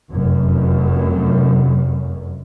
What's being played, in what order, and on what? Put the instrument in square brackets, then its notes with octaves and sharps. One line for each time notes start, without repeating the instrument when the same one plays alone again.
[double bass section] F1 F#2